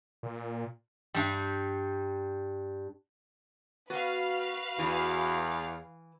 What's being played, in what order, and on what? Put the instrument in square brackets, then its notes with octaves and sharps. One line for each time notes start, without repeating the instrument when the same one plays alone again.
[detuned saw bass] A#2
[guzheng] G2 G3
[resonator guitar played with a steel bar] B3 [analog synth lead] F#4 [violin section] B4 F5
[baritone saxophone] E2 [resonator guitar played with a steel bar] E3